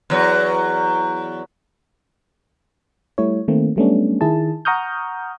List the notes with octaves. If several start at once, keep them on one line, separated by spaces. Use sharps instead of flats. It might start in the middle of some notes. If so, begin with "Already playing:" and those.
E2 F#3
G3 A3 E4 C#5
D#3 A3 A#3 C4
F#3 G3 A3 B3 C#4 D4
D#3 E4 G#4 A5
F#5 A#5 C#6 D#6 F6 G6